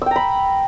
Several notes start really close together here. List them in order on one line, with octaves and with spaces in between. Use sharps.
E6 G5 A#5 B5